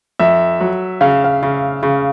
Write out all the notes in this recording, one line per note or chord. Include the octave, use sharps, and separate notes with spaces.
F2 E5
F#3
C#3 F5
F5
C#3
C#3